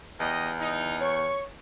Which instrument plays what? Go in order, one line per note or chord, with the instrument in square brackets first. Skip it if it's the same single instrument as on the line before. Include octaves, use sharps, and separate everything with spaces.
[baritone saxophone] E2 [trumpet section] G4 D#5
[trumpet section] D#4
[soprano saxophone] C#5 [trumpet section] C#6